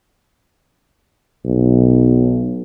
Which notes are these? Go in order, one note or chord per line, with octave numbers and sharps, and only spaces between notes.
B1